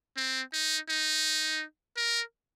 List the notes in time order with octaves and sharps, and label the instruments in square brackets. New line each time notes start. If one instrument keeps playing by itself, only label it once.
[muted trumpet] C4
D#4
D#4
A#4